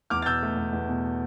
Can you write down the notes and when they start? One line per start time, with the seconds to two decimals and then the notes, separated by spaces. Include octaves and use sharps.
0.10 E2 D6 F6
0.22 A6
0.26 B2 E6 G6
0.43 A3
0.57 E2
0.73 E2
0.88 B2